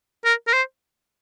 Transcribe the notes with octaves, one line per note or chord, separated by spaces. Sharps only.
A#4
A#4
C5